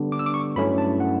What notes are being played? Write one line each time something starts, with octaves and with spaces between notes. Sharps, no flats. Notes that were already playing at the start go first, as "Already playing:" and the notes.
Already playing: D3 G3 B3 D4
D6
E6
D6
C#6
G2 F#3 A3 C#4 E4 B5
A5
F#5